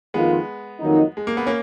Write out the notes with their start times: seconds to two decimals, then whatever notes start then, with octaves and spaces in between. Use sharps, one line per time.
0.14 F2 D#3 G#3 A#3 B3 F4
0.80 F2 D#3 F#3 A#3 D#4
1.17 G#3
1.27 A#3
1.37 B3
1.46 A#3 C#4